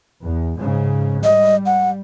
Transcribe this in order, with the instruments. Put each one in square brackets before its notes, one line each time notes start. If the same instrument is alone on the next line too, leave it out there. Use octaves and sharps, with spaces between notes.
[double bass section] E2
G#2 C#3
[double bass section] G3 [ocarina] D#5
[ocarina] F#5